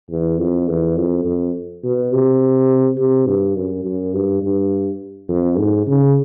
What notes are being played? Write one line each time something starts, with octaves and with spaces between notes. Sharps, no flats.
E2
F2
E2
F2
F2
B2
C3
C3
G2
F#2
F#2
G2
G2
F2
G#2
C#3